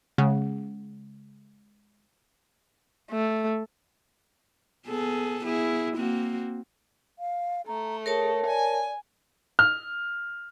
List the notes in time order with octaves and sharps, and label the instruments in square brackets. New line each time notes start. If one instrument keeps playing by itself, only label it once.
[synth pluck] C#3 [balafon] G#3
[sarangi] A3
[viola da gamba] B3 G#4 A4
B3 E4 G#4
A#3 C4 F#4
[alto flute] F5
[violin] A3 [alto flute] A#5
[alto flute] G#4 [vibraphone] A#4 C#5 A5
[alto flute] D5 [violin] G#5
[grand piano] F6